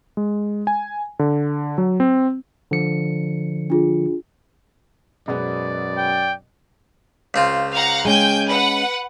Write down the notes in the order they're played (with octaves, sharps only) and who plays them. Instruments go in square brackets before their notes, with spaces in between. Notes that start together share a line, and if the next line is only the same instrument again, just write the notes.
[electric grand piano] G#3
G#5
D3
F#3
C4
[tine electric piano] D3 F3 C#7
[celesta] D4 F4 G#4
[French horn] F#2 [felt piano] B2 G#3 B3 [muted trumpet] D5
[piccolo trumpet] G5
[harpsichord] C#2 C4 F4
[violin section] F5 F#5 A#5
[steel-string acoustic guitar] G#3 C#4 [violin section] G5 G#5 G6
[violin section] B4 F#5